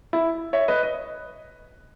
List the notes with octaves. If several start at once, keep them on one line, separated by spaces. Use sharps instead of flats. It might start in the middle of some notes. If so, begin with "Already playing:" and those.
E4
C#5 E5
B4 D#5
D#5